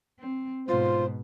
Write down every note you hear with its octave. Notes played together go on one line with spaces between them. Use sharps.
C4
G#2 B2 F4 C5